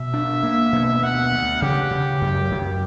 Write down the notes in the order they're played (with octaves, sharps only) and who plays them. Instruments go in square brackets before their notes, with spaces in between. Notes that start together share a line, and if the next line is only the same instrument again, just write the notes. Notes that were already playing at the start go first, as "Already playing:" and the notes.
Already playing: [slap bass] B2 [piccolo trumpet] E5
[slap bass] D4
A#3
B2
[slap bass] D2 [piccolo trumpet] F#5
[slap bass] D2
[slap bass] C#3 [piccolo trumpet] G4
[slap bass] C#3
F#2
F#2